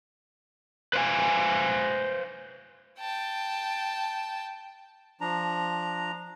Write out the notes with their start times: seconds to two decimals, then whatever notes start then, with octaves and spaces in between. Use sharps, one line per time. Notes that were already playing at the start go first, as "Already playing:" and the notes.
0.93 B4 C5 E5 F5 G#5
3.00 G5 A5
5.21 F3 D4 A#5